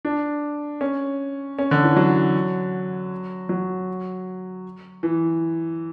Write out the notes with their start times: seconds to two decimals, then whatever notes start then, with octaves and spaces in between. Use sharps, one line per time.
0.05 D4
0.81 C#4
1.59 C#4
1.71 D3
1.84 E3
1.96 F#3
3.49 F#3
5.03 E3